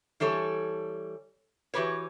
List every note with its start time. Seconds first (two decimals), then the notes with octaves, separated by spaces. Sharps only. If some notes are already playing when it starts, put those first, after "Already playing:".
0.20 E3 G3 A4 C#5
1.74 E3 F#4 G4 B4 C#5